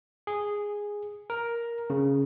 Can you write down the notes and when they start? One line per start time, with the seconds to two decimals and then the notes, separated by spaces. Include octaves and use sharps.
0.27 G#4
1.30 A#4
1.90 C#3